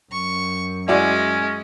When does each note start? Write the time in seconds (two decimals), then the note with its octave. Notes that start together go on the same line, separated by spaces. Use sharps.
0.12 F#2 C#6
0.88 G#3 C#4 E4 F#4 D5